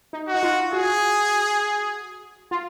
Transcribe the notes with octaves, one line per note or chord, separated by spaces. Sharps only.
D#4
F#4
D#4
F4
F#4 G#4
F4